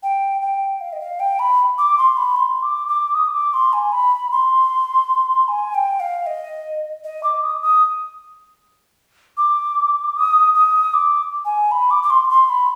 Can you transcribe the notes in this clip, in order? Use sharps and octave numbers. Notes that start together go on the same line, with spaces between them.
G5
G5
F5
D#5
F5
G5
B5
D6
C6
B5
C6
D6
D6
D#6
D6
C6
G#5
B5
C6
G#5
G5
F5
D#5
D#5
D6
D#6
D#6
D6
D#6
D#6
D6
G#5
B5
D6
D6
C6
C6
B5